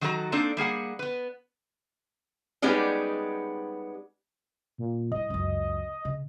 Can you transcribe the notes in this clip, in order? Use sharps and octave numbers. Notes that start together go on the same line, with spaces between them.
D#3 F#3 F#4 A4 B4 A#5
A#3 C4 D4 D#4 A4
G3 A#3 G#4 F#5
B3 B4
G3 G#3 B3 C#4 D#4 G4
A#2
A2 G3 D#5
C#2 F#2
C#3